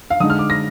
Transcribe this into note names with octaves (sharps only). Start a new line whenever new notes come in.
F5
D3 G#3 D#4 D#6
F6
D6
A#6